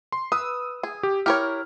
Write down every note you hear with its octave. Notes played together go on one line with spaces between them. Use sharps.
C6
B4 D#6 E6
G#4
G4
E4 G4 A#4 C#5 F6